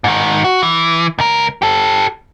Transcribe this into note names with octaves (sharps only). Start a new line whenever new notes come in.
G#2 D#3
F#4
E3
C#2 A#4
G4 A4